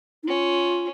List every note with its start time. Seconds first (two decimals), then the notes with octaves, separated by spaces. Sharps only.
0.23 D#4
0.27 C#4 F4